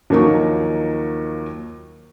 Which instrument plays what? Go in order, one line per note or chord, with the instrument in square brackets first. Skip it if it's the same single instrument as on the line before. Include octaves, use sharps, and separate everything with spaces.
[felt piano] D#2 F3 F#3 A#3 D#4 C#6